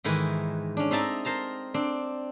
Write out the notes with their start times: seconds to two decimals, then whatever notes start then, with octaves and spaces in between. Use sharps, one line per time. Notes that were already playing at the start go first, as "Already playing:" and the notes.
0.04 G#2 D#3 E3 B4
0.77 C#4 D4
0.91 C4 D#4 E5 A5 A#5
1.25 A#4 C5 A5 A#5
1.74 C4 D4